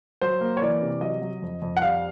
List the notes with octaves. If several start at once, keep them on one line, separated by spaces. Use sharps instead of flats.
F#3 C5
A#3
C#5
E3 D5
C3
F#3 D#5
F#3
F2
F2
F#5
G3 F5